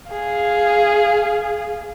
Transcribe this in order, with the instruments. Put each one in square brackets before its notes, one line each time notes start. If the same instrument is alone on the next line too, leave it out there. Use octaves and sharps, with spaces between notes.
[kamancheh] G#4 F5